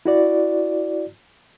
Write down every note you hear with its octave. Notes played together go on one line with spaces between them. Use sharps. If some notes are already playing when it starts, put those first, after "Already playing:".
E4 F#4 D5